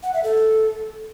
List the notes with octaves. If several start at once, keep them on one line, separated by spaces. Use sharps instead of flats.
F#5
E5
A4